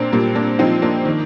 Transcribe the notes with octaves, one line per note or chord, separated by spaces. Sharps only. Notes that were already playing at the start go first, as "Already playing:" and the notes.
Already playing: A#2 A#3 C4 D4
A#2 G3 A#3
A#3 D4
F3 C4 D#4
A#3 D4
D#3